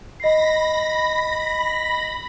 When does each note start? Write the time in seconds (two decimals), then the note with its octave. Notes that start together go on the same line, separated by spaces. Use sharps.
0.20 D#5 B5 A#6 C7